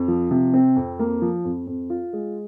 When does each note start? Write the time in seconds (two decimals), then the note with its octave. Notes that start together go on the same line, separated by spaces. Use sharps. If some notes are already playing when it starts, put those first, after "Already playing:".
Already playing: F2
0.08 F3
0.31 C3
0.54 C4
0.76 F2
0.99 A#3
1.22 F3
1.44 F2
1.67 F2
1.90 F4
2.13 G#3